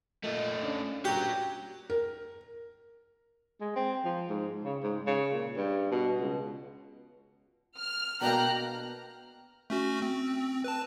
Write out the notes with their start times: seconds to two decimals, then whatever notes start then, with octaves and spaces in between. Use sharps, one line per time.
0.24 A#2 A3 F4 D#5
0.64 C#4 D4
1.05 G2 A#2 F#4 G4 A#5
1.90 A#4
3.61 G#3
3.76 C4
4.05 F3
4.29 G#2
4.64 C#3
4.83 G#2
5.07 C#3
5.33 A#2
5.56 G2
5.92 B2
6.20 C#2
7.77 F6
8.22 B2 A#3 D4 G5 A#5 F6 F#6
9.70 A3 C#4 F#4
10.02 C4
10.64 B4 A5